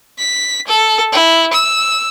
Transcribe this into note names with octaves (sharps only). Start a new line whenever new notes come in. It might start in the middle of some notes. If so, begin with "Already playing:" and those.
B6
A4
E4
E6